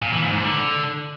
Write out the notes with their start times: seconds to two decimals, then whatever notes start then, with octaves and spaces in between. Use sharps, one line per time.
0.02 A#2
0.12 E3
0.22 G#2
0.33 G#2
0.43 D3